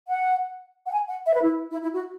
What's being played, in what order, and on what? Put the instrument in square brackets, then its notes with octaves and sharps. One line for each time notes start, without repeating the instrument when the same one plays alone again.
[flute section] F#5
F#5
G#5
F#5
E5
B4
E4
E4
E4
F#4